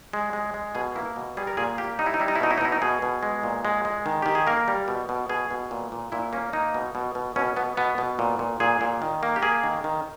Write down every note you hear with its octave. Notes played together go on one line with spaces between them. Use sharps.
G#3
G#3
G#3
B2 G#4
A#3 E4
B2
G3 G#4
A#4
A#2 G#4
A#3 G4
G3 D#4
E4
D#4
G3 E4
D#4
E4
B2 D#4
E4
D#4
B2 E4
D#4
B2 G#4
B2
G#3
A#2
G#3
G#3
D#3
D#3 G4
G#4
A#3 A#4
G3
B2
B2
B2 G#4
B2
A#2
A#2
A#2 E4
A#3 C#4
A#3 D#4
B2
B2
B2
B2 C#4
B2 B3
B2 B3
B2
A#2
A#2
A#2 G#4
A#2
D#3
A#3
G4
A#3 G#4
D#3
D#3